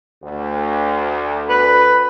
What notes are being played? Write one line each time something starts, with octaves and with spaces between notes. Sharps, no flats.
D2
B4